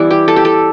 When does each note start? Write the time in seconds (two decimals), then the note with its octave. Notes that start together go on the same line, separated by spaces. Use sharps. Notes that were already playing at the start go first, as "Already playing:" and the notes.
Already playing: E3 G3 B3 E4 D5
0.11 G4
0.28 A4
0.36 G4
0.45 A4